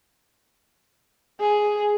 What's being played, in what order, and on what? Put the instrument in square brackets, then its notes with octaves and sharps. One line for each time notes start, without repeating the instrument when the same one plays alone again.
[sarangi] G#4